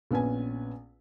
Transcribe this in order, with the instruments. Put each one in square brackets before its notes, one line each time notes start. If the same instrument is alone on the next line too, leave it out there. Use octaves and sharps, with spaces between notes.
[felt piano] A#1 B3 C#4 B4 G#5